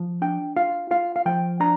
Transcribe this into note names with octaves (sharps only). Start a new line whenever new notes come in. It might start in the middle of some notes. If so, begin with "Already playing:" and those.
Already playing: F3
D4 G5
F4 F5
F4 F5
F5
F3 G5
D4 A#5